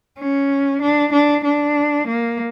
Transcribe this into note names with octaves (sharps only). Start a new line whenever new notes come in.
C#4
D4
D4
D4
A#3